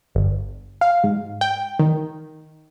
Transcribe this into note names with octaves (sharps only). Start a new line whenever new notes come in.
G1
F5
G#2
G5
D#3